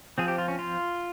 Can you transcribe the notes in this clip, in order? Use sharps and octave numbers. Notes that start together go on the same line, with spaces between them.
F3 C4 G#4
G4
F4
C#4
F4